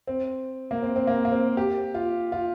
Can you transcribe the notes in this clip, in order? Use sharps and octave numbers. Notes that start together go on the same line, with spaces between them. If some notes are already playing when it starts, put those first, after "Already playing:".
C4
A#3
C4
C4
A#3
A#3
C4
G4
F4
F4